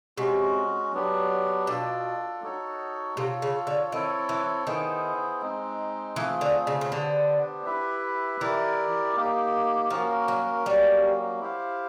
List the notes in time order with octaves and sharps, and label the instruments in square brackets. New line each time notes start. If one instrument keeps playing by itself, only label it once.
[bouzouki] C3 [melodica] G#3 C#4 F#4
[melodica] F#3 B3 D4 G4
[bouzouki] B2 [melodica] D4 F4 A4 D5
[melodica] D#4 F#4 A4 C#5
[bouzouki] C3 [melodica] F4 A4 C#5
[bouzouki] C#3
D3
[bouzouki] D#3 [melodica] C4 E4 A4 C#5
[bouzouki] E3
[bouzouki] D#3 [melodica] B3 E4 G#4 C5
[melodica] G#3 C4 D#4
[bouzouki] E3 [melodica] A3 C4 F4 G#4
[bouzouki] D3
C#3
C#3
[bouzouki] D3 [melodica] B3 D4 G4 C5
[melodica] E4 G4 B4 E5
[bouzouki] E3 [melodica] E4 G4 A#4 D5
[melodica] A#3 D#4 G4
[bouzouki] F3 [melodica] A#3 C#4 F#4 A#4
[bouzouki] F#3
[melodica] F#3 A#3 C#4 F#4 [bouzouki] G3
[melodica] E4 G4 C5 F5